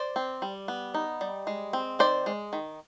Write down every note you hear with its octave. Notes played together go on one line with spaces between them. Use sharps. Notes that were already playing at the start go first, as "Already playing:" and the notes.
Already playing: C5 D5
C4
G3
B3
D#4
G3
G#3
C4
D#3 C5 D5
G#3
D#3